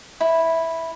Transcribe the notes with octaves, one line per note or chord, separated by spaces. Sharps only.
E4